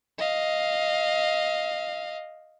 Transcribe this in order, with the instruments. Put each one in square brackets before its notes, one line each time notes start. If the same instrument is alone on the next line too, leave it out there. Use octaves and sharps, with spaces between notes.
[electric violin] D#5 F5